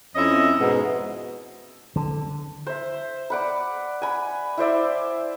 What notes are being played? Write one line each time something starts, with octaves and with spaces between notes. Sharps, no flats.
F2 C#4 E4 D#5 E5
G#2 B2
D3
C5 E5
D5 F#5 B5
G#5 B5
E4 C5 D5 E5